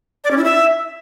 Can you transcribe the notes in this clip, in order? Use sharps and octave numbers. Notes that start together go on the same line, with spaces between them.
D5
C#4
E4
E5